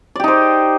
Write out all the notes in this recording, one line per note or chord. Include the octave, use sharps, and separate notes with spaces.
D#4 G4 C5 D5